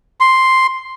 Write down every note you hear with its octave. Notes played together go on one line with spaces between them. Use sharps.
C6